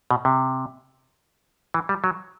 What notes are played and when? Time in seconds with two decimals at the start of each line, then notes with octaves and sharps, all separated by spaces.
0.11 B2
0.25 C3
1.74 E3
1.89 G3
2.04 F#3